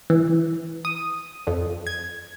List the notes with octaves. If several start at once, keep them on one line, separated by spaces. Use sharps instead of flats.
E3
D#6
F2
G#6